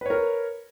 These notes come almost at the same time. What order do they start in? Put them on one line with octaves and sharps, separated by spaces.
B4 C#5 A#4